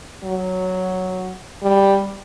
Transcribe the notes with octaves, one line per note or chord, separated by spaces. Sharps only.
F#3
G3